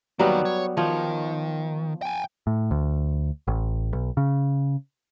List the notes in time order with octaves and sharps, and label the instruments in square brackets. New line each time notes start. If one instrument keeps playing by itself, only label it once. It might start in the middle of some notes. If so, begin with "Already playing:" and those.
[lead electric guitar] D#3 A#3 [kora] F#3 G3 B3
[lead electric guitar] C#5
[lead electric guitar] D#3 [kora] F3 C#5
[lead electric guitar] G5 G#5
[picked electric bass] A2
D2
A1
B1
C#3